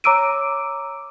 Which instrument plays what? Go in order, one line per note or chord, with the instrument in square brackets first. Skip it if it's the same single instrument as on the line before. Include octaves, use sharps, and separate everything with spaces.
[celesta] C#5 A#5 D6 E6 D7 D#7